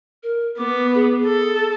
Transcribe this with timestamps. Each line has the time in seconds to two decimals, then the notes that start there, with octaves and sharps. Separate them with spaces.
0.23 A#4
0.58 B3 D6
0.94 G#4
1.26 A4